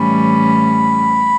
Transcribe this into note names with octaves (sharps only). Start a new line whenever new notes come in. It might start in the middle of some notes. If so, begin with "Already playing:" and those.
Already playing: A2 E3 G3 C#4 B5